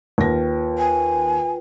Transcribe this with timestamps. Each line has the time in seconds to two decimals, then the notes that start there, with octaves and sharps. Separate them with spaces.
0.18 D#2 F4 B4 G5 A#6
0.78 G#5